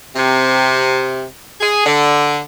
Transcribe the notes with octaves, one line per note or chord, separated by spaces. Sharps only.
C3
G#4
D3